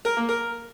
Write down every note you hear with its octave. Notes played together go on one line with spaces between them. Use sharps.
A#4
A#3
A#4